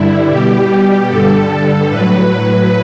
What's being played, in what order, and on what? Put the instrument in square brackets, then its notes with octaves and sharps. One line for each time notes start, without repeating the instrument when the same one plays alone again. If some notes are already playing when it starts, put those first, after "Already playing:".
Already playing: [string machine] G2 D3 G3 E4
B2 G3 G4
G2 D3 G3 A4
A2 F#3 B4